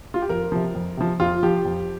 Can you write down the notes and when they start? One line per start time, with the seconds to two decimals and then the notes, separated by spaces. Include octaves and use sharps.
0.14 F4
0.22 G4
0.29 F2 A#4
0.52 C3 F3
0.75 F2
0.97 C3 F3
1.20 F2 F4
1.43 F3 G4
1.65 F2